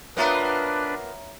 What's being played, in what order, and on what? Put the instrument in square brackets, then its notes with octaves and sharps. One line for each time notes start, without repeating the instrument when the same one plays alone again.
[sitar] A#3 B3 F4 [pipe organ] D4 B4 [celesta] C#5 E5 A#5